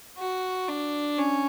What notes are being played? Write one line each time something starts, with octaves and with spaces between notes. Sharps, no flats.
F#4
D4
C#4